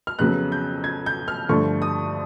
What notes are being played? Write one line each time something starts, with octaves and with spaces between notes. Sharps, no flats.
F6
F2 C#3 F#3 B3 F#6
G6
G#6
G6
F6
G2 D3 F3 A3 C#6
D#6